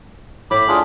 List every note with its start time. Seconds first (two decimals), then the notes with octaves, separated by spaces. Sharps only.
0.51 A2 B5 D6
0.68 D4 F4 G#4